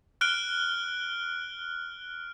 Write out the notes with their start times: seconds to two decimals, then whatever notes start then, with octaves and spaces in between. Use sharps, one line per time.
0.21 F6 F#6 D7 G7